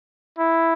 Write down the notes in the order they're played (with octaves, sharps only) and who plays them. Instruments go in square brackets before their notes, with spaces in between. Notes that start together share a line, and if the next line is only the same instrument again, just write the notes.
[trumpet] E4